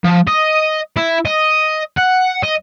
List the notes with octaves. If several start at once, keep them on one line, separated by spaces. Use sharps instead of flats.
F3
D#5
E4
D#5
F#5
D#5